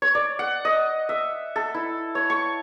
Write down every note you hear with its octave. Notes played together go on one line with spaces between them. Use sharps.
C#5
D5
F#5
D#5
E5
A4
E4
C#5
C#6